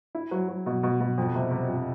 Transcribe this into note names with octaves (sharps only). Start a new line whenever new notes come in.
E4
F#3
F#3
B2
B2
B2
F2
C3
C3
F2